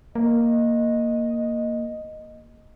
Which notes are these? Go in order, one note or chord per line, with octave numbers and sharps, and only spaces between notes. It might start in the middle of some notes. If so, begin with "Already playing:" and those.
A#3 D#5